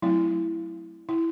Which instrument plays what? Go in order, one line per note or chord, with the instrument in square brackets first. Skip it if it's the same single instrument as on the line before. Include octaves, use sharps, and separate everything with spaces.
[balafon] F#3 A3 C4 E4
E4